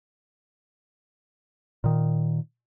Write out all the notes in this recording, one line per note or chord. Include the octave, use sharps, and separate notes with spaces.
A#2 D#3